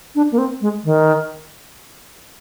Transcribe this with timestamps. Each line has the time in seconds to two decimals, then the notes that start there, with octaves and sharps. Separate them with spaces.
0.15 D4
0.32 A#3
0.38 C4
0.61 G#3
0.85 D#3